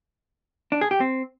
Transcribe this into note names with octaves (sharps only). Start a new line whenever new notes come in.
D4
G#4
G4
C4